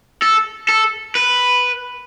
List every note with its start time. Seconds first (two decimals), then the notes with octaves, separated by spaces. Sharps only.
0.22 A4
0.69 A4
1.15 B4